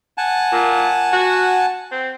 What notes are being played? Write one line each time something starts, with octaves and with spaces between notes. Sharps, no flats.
F#5 G#5 A5
A#2
F#4
C4